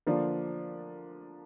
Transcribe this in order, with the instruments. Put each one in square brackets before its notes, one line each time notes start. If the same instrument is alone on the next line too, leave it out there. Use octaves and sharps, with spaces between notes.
[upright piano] D3 F3 A#3 D4 F4